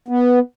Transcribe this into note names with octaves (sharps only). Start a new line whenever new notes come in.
B3